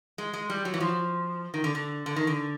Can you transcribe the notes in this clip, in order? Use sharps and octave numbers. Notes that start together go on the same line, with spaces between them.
G#3
G#3
G3
F#3
E3
F3
D#3
D3
D3
D3
D#3
D3